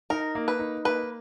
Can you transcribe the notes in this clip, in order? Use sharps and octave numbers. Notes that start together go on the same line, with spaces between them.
D#4 A#4
A#3
B4
D#4
A#3 B4